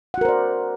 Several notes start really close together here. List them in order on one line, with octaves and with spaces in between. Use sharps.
F#5 F#4 A#4 C5 D5